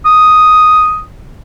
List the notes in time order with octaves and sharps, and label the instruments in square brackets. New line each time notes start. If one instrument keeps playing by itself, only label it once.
[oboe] D#6